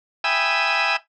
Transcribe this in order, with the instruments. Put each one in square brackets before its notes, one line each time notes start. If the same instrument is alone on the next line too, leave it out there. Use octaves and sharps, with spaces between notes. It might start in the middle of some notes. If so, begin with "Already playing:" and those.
[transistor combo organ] E5 G5 G#5 B5 D#6 E6